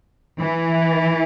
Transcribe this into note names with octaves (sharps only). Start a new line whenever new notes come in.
E3